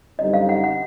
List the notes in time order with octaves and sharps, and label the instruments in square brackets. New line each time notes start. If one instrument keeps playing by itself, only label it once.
[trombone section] F#2 D3 G3 C4 D#4 [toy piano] D#5
[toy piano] F5
F#5
F#5